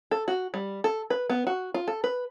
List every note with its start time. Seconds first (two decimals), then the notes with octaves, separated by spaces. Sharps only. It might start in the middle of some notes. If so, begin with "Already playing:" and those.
0.11 A4
0.28 F#4
0.54 G3
0.84 A4
1.10 B4
1.30 B3
1.47 F#4
1.74 F4
1.88 A4
2.04 B4